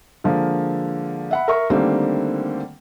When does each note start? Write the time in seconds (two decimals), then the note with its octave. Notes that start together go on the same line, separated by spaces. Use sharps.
0.24 D3 F3 G#3 A#3
1.31 E5 F#5 B5
1.48 A#4 E5 C#6
1.70 D3 D#3 G3 A3 A#3 C4